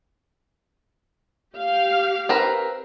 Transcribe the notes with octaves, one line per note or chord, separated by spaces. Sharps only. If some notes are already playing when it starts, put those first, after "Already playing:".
G4 F5
C4 A#4 B4